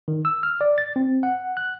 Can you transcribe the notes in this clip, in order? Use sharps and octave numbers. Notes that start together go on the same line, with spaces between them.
D#3
E6
F6
D5
A6
C4
F#5
F#6